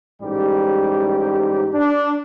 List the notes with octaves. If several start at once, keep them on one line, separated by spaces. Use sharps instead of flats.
A1 G#2 G3 G4
D4